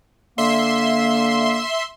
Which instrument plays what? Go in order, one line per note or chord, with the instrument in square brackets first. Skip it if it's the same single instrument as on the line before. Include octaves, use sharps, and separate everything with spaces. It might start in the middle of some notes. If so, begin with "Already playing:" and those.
[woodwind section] D3 A#3 [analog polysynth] E5 C6